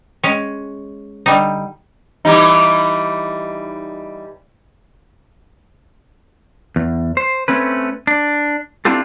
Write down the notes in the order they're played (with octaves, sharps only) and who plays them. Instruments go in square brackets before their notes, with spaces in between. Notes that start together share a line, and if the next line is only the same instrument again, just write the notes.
[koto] G#3 C#4
D3 G3 D#4
[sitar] E3 G3 D#4
[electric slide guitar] E2
C5
A3 C4 C#4 B4
D4
C4 D4 E4 F4 G4 A4